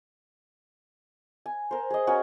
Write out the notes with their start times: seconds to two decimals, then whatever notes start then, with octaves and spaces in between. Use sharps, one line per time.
1.46 G#5
1.71 A#4 C5
1.90 G#4 D#5
2.07 C#4 F#4 A#4 G#5